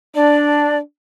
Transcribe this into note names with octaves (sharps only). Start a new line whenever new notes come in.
D4 D5